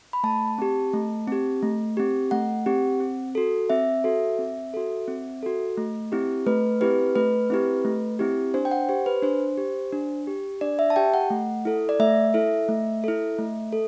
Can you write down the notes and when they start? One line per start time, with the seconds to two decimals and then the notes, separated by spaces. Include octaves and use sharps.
0.13 B5
0.24 A3 A5
0.58 C4 G4
0.93 A3
1.28 C4 G4
1.62 A3
1.97 C4 G4
2.31 A3 F#5
2.66 C4 G4
3.00 C4
3.35 F#4 A4
3.70 C4 E5
4.04 F#4 A4
4.39 C4
4.74 F#4 A4
5.08 C4
5.43 F#4 A4
5.77 A3
6.12 C4 E4 G4
6.47 A3 B4
6.81 C4 E4 G4 B4
7.15 A3 B4
7.50 C4 E4 G4
7.85 A3
8.19 C4 E4 G4
8.54 D4 C5
8.65 G5
8.71 F#5
8.89 G4 C5
9.06 B4
9.23 D4 C5
9.58 G4
9.93 D4
10.27 G4
10.61 D4 D5
10.79 E5
10.90 A5
10.96 G4 G5
11.14 F#5
11.31 A3
11.65 E4 A4
11.89 D5
12.00 A3 E5
12.34 E4 A4
12.69 A3
13.04 E4 A4
13.38 A3
13.72 A4